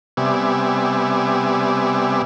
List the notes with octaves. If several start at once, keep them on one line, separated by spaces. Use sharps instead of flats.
C3 G3 B3 D5 E5 G#5